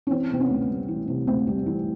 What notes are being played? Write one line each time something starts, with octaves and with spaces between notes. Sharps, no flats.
C#4
E3 C4
C3 C4
B3 C#4
D2
G3
E3
C3
D2 C4
G3
E3